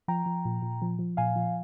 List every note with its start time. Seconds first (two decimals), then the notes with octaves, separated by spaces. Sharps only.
0.08 F3 G5 A#5
0.26 F3
0.45 A#2
0.62 A#2
0.82 F3
0.99 F3
1.17 A#2 F5 G#5
1.36 F3